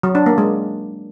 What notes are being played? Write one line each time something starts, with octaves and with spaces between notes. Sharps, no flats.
F#3
D4
A#3
G#3